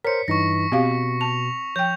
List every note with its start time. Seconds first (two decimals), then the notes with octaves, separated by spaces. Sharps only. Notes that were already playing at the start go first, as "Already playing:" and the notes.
0.05 A#4 C5 C#5 B6 C#7
0.28 G2 E3 D#4 C#6 A#6
0.72 B2 C4 G4 F5
1.21 A5 F7
1.76 F3 G5 G6